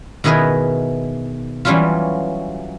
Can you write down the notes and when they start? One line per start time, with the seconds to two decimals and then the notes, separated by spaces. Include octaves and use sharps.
0.24 B2 D#3 E4 G#4 A#4 B4
1.65 E3 F#3 G3 C#4 E4 F4